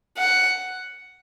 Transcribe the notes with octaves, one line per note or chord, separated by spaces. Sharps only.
F#5